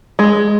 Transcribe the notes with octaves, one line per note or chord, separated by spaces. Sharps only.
G#3